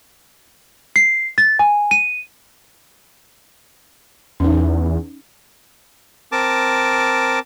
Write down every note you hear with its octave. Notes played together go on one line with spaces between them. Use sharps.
C7
A6
G#5
D#7
E2 C#4 D#4
C4 A#4 A5 D6